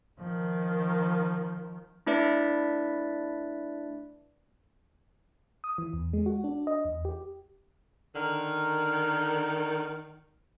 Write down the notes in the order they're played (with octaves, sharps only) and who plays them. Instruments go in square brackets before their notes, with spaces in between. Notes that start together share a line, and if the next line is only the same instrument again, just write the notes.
[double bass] D#3 F3
[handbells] A3 D4 E4 B4 D5 E5
[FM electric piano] D#6
E3
E2
G#3
F#4
D4
D#5
E2
G4
[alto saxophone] D3 [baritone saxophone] D#3 [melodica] A#4